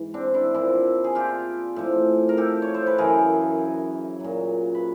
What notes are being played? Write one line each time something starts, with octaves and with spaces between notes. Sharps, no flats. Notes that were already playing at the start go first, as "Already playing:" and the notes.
Already playing: G#2 E3
C4 D4
D4 E4
A#2 F3 D4 E4
G#4
F4 G4
A2 F3
A#4
G4 A4
C#5
C5
B4
F#2 C#3 E3 G#4 A#4
A#2 F#3
B4